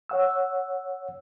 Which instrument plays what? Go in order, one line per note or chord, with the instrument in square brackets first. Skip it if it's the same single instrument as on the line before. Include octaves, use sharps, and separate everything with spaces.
[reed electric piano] C#5 F#5 E6